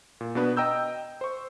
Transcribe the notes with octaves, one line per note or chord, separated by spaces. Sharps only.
A#2
B2 B3 D4 B4
D#5 G5 A#5 E6 G6
C5 C#6